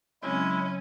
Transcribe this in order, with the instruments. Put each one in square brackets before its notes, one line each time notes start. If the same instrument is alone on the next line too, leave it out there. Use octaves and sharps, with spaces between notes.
[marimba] C#3 F#3 C4 [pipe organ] G#3 E4 [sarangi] C#4